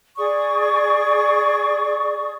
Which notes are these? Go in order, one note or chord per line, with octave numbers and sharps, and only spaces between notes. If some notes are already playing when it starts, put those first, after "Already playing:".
G#4 D5 C#6 D#6